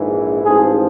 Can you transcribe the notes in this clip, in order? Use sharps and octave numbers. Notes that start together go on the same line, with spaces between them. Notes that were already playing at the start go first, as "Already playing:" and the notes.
Already playing: A#1 G#2 E3
A1 G#2 F3 G#4